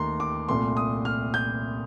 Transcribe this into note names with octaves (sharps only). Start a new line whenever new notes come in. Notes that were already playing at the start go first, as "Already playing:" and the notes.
Already playing: D#2 D#3 A3 A#5 C6
D6
C2 A#2 A3 C6
D#6
F6
G6